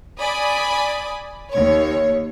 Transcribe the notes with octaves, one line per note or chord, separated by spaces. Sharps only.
D5 G#5 B5 D#6
D#2 C#5